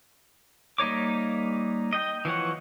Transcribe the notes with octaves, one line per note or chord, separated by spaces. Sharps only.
G3 A#3 D#4 C#5 D6
D#5 G5
E3 F3 C#5 F#5